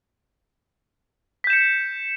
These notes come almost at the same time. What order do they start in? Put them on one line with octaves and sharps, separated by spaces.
B6 G6 E7 C#7